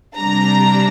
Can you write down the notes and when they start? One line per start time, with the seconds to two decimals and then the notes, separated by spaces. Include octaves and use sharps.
0.16 C3 G3 D4 A#5